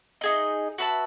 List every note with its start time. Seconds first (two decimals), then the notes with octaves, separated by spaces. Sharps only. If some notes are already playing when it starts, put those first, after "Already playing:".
0.21 D#4 G#4 D#5
0.78 F#4 B4 E5 A5